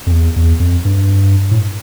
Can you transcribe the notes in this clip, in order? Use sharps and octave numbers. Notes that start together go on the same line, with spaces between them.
F2
E2
E2
F2
G2
A2